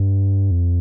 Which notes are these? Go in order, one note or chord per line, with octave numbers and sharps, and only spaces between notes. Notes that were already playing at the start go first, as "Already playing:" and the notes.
Already playing: G2
F2